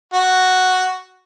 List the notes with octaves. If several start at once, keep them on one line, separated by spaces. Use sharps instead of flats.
F#4